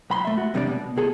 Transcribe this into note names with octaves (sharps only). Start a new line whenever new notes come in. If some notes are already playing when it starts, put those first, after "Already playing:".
B1 B5 C6
A3 E5
F#4
E2 C3 G3 D4 D5
B2
C2 G#4 A4